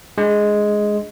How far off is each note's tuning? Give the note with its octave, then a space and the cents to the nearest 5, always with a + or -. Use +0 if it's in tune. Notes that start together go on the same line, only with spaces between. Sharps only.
G#3 +5 D4 -10